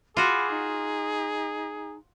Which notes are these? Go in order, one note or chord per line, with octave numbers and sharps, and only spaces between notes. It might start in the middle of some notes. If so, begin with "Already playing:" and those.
F4 F#4 G#4 B5 D6
D#4